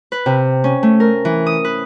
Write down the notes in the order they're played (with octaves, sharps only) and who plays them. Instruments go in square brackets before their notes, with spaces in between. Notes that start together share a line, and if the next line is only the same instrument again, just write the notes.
[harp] B4
C3
C#4
A3
A#4
E3
D#6
B4